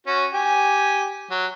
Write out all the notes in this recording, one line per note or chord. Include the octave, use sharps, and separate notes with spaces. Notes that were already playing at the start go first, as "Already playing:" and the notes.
C#4 F#4
G4 G#5
F#3